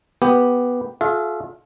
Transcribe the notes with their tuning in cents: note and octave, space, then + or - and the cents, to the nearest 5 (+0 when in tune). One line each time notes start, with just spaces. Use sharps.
B3 +0 G4 +0
F4 +35 A4 -45 E5 +40